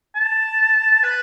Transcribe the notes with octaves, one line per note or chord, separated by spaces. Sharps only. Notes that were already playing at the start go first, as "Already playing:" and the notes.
A5
B4